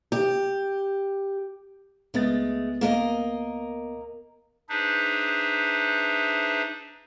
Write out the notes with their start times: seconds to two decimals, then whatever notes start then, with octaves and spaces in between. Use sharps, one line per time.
0.12 G4
2.14 C#2 G#3 A3 B3 A6
2.81 A#3 A#4 D#5
4.69 D4 D#4 G#4 B4 C5 E5